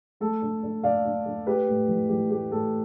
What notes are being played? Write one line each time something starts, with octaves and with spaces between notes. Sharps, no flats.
A3 A4
D3
D3
D3 D5 F5
D3
D3
A3 G4 B4
A2
E3
E3 G4
A3 G4
A2 A4